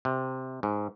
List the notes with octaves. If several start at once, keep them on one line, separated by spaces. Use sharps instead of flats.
C3
G#2